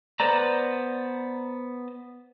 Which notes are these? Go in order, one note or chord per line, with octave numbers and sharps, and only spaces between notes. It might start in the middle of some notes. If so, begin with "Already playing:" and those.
B3 B4 C5 D5 A#5